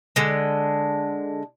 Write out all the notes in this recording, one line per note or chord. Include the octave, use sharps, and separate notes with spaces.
D3 G#3